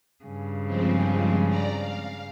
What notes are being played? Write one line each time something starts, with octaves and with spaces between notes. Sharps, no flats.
G2 C#3
F3 G#3 C4
D5 A#5
F5